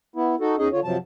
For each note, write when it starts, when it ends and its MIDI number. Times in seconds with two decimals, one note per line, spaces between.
0.16 0.35 59
0.16 0.35 64
0.40 0.56 63
0.40 0.56 66
0.40 0.56 69
0.58 0.68 40
0.58 0.68 61
0.58 0.68 63
0.58 0.68 68
0.58 0.68 75
0.72 0.80 50
0.72 0.80 65
0.72 0.80 73
0.84 0.97 42
0.84 0.97 48
0.84 0.97 53
0.84 0.97 54
0.84 0.97 81